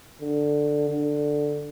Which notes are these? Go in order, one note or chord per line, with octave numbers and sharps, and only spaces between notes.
D3
D3